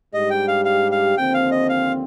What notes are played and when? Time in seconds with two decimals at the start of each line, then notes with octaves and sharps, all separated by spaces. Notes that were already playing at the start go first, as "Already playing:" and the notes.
0.14 G#2 G3 D4 G4 D#5
0.30 G5
0.48 F5
0.65 F5
0.92 F5
1.17 D#2 D3 F3 C4 G5
1.34 F5
1.51 D#5
1.69 F5